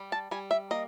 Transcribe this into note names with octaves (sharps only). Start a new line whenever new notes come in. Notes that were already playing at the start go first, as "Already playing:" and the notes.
Already playing: G3
A5
G3 G#5
E5
A#3 D#5